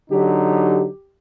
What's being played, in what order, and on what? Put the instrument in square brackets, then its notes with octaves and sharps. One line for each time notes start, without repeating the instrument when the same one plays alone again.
[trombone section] D3 F#3 D#4 [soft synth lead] G4